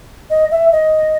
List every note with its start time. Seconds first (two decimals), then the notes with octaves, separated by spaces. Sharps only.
0.30 D#5
0.51 E5
0.72 D#5